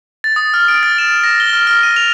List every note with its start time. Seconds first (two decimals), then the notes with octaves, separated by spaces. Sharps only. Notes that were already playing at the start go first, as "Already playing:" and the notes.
0.24 A6
0.36 D#6
0.54 F6
0.68 D7
0.83 A6
0.98 E7
1.23 A#6
1.40 G7
1.53 F6
1.67 F6
1.83 D#7
1.96 F7